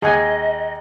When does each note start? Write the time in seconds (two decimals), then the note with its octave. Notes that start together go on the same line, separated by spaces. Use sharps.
0.02 D#2 G#4 D#5 F#5 G#5